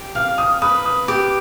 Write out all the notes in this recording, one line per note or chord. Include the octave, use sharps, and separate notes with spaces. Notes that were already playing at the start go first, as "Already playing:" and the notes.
Already playing: G4
F5 F6
D#6
B4 D#6
D#6
G4 D6